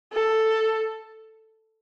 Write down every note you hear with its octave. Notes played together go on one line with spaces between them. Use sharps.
A4